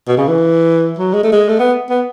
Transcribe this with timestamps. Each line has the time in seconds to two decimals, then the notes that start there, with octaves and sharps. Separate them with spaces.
0.08 B2
0.18 C#3
0.28 E3
0.99 F#3
1.14 G#3
1.23 A3
1.32 G#3
1.49 A3
1.59 B3
1.90 B3